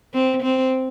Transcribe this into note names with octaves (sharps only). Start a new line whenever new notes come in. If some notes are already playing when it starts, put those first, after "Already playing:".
C4
C4